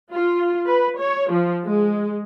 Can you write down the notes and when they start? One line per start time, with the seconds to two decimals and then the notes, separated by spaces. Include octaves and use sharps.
0.13 F4
0.67 B4
0.99 C#5
1.30 F3
1.65 G#3